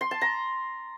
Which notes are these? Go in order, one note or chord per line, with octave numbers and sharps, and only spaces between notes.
C6
A5
A#5